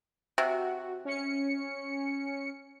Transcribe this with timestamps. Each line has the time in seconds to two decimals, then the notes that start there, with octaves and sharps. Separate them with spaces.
0.38 C3 F#4
1.05 C#4 C#7